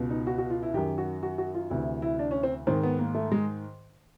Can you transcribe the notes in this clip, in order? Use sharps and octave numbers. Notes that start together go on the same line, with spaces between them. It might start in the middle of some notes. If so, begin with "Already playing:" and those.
Already playing: C#2 B2
D#4
F#4
F#4
F4
E4
F#2 D#3 G4
F#4
F#4
F#4
F4
D2 C3 E3 E4
E4
D4
C#4
C4
G#2 D#3 C4
B3
A#3
A3
G#3